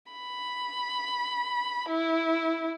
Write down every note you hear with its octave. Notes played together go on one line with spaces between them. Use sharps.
B5
E4